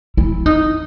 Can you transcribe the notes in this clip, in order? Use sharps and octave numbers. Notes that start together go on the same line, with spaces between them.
E4
D#4